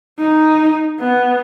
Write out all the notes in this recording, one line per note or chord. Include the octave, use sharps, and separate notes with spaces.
D#4
B3